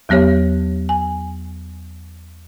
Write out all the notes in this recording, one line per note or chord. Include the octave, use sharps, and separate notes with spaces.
E2 F#3 B3 G4 C#5
G#5